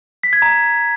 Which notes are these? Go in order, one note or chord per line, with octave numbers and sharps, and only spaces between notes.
B6
G#6
A#5